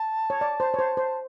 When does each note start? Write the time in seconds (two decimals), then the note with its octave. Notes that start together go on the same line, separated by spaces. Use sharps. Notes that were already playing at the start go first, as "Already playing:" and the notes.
Already playing: A5
0.30 C#5
0.41 D5
0.60 C5
0.74 C#5
0.79 C5
0.97 C5